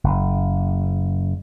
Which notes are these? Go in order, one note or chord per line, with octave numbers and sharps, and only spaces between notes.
F#1